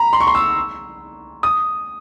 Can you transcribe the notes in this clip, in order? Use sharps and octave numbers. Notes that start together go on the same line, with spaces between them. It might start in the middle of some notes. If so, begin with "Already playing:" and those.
Already playing: A#5 B5
C6
C#6
C6
E6
D#6